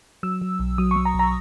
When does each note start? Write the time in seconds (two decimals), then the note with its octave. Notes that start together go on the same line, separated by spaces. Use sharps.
0.23 F#3 E6
0.42 F#3
0.59 B1
0.78 F#3 D#6
0.91 C#6
0.96 F#3
1.05 A#5
1.14 B1
1.19 A#5